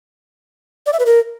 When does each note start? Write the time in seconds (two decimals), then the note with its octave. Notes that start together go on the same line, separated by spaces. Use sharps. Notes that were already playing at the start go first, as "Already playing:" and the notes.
0.86 D5
0.93 E5
0.99 B4
1.06 A#4